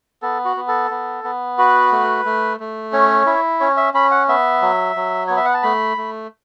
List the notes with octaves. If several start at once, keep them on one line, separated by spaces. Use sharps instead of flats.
B3 A4
F#4
B3
A4
B3
B3
F#4 B4
A3
A3
A3
C#4 C#5
E4
C#4 C#5
E5
C#4 B5
F#5
B3 E5
F#3
F#3
B3 C#5
E5
F#5
A5
A3 B5
A3